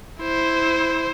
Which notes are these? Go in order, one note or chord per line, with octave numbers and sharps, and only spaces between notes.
E4 C5